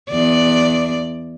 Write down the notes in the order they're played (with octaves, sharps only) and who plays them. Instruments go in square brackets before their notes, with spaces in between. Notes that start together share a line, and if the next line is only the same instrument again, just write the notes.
[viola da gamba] E2 D5